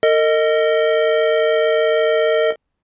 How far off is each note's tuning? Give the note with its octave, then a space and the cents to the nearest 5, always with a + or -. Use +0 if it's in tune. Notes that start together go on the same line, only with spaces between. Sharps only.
A#4 -45 D#5 +0